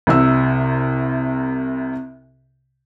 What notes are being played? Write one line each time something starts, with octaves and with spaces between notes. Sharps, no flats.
C2 C3 E6